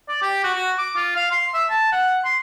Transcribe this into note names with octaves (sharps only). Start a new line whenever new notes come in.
D5
G4
F#4
F#4
D6
F4
F5
C6
E5
A5
F#5
C6